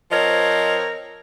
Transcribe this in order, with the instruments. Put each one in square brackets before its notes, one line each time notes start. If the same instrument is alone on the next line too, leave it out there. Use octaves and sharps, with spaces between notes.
[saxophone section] F3 C4 A#4 C#5 D#5